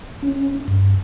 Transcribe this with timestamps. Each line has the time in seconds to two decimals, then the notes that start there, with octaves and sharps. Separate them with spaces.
0.22 C#4
0.68 G2